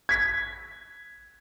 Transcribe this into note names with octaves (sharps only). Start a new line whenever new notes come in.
G#6 B6